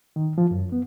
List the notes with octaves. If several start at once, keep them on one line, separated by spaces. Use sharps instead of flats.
D#3
F3
F#2
B3